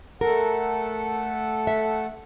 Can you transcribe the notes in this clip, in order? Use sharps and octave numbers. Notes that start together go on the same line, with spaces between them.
A3 A4 A#4 F#5
E5